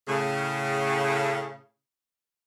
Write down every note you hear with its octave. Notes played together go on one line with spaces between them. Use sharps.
A2 C#3